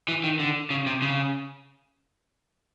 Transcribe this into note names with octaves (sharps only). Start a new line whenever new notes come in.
E3
D#3
D3
C#3
C3
C#3